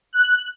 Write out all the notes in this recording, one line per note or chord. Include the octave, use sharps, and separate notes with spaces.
F#6